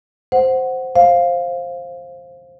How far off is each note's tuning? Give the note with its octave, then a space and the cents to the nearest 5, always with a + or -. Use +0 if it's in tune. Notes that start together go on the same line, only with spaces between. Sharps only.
C5 +0 F#5 +0
C5 +15 F5 +0